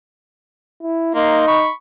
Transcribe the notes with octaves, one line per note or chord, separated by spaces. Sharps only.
E4
A#3 D#4 C6
B5 C#6